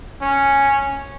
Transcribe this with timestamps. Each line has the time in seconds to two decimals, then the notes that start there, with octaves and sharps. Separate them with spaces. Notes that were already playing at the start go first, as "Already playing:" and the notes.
0.21 C#4